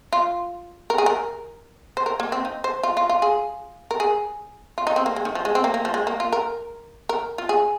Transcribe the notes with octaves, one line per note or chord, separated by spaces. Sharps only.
F4
A#4
G#4
A#4
C5
A#4
A#3
C4
D#4
C5
F4
F4
F4
G#4
A#4
G#4
F4
D#4
C4
A#3
G#3
D#3
F3
G#3
C4
A#3
A#3
F3
G#3
A#3
F4
A#4
A#4
F4
G#4